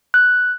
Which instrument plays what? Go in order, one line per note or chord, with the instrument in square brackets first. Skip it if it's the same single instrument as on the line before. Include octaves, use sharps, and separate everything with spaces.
[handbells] F#6